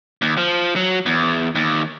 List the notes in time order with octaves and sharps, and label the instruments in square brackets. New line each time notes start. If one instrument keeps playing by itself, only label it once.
[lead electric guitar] D#2
F3
F#3
E2
D#2